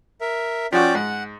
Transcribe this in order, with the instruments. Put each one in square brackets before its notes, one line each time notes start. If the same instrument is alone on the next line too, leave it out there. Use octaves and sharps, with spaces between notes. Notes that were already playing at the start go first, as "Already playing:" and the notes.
[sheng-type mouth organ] A#4 E5
[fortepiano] F3 F#4 [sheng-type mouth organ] C#4 D5 G5
[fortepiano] G#2 [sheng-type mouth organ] F#5